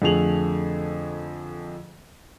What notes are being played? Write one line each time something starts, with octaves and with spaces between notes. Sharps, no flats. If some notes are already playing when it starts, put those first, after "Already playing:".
F2 D3 A3 G#4 F7 F#7